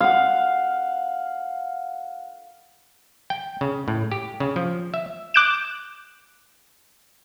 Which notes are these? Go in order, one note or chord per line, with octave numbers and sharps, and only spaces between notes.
F5 F#5
G5
C#3
A2
G4
C#3
F3
E5
D6 F#6 G6 D7 E7